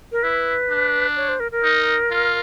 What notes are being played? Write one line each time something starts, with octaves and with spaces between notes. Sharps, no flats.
A#4
E4 B4
D4
C#5
C5
A#4
A#4
D#4
F4